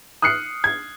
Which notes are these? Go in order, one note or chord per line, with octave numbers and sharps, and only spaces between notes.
D#6 F6 F#6 C7 C#7
G#6